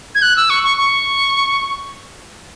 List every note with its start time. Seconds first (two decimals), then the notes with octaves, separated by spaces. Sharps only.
0.15 G#6
0.22 F#6
0.37 E6
0.50 C#6
0.64 C#6
0.78 C#6